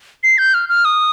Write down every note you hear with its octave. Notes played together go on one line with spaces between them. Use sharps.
C7
G6
F6
F6
D#6